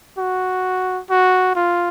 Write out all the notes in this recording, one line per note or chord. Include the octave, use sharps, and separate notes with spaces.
F#4
F#4
F4